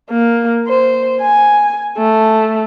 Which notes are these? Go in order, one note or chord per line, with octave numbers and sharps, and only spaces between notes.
A#3
C5
G#5
A3